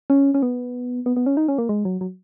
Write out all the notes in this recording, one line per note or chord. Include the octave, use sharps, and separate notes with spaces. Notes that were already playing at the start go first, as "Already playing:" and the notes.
C#4
C#4
B3
B3
B3
C#4
D#4
C#4
A#3
G#3
F#3
F#3